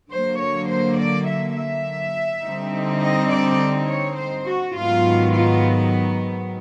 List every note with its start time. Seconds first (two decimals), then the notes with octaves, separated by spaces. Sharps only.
0.11 D3 F#3 A#3 C5
0.40 C#5
0.70 C5
0.98 D5
1.27 E5
1.56 E5
2.43 D3 G3 C4 D#4
3.01 D#5
3.30 D5
3.88 C#5
4.17 C5
4.46 F#4
4.75 G#2 D#3 F#3 B3 F4
5.33 F4